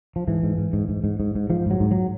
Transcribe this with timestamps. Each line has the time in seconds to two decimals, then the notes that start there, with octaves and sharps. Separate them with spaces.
0.16 F3
0.27 G#2 E3
0.43 G#2
0.58 G#2
0.73 G#2
0.89 G#2
1.04 G#2
1.20 G#2
1.35 G#2
1.50 G#2 F3
1.66 G#2 F#3
1.80 G#2
1.91 F#3